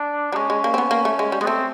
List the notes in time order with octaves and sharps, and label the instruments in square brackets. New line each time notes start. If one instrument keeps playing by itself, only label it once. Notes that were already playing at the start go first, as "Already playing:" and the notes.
Already playing: [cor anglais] D4
[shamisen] G3 [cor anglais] D4
[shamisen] G#3 [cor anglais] C#4
[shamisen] G#3
A#3
C4
B3
A#3
A3
G#3
G3
[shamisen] G#3 [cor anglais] B3
[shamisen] A3 [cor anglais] C4